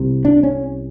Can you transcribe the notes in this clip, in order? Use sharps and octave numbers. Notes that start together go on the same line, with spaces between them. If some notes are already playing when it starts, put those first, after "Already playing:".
Already playing: C2 C3
D4
C#4